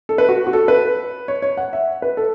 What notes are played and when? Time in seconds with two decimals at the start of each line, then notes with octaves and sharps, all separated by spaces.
0.09 A4
0.18 B4
0.29 F#4
0.47 F#4
0.53 A4
0.68 B4
1.28 C#5
1.42 C#5
1.57 F#5
1.73 E5
2.02 B4
2.17 A4